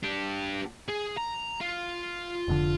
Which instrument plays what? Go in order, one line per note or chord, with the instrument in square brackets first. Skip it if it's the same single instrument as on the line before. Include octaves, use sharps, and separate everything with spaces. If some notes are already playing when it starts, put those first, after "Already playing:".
[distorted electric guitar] D4 G4
G#4
A#5
F4
[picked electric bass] F1 A#2 D3